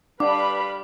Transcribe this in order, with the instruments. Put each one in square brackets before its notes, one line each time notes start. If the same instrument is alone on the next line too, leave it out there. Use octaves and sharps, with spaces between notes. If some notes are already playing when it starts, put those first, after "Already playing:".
[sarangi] G3 [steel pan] D4 [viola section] B4 F5 B5 [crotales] D6